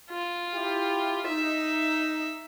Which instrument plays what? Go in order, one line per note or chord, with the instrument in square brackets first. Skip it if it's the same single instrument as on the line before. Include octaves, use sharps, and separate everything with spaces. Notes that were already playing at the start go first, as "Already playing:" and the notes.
[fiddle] F4
[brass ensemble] E4 G4
[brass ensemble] D#4 [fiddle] E5